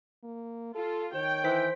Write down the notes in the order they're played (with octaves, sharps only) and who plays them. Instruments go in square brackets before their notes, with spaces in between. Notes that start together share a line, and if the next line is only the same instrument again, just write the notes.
[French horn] A#3
[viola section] F4 [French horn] A4
[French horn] D#3 [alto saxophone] C#5 [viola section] G5
[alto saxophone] E3 [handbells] C5 B6